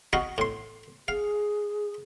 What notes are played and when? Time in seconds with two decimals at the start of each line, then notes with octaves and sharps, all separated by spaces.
0.13 D#4 F#4 F5
0.38 A2 C6
1.08 G#4 F5